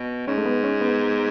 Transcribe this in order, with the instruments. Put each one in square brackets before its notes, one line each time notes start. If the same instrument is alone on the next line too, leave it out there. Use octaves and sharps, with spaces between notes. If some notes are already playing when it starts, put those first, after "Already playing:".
Already playing: [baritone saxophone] B2
[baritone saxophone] G#2 [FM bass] C#4
[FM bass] A3
B3
C#4
B3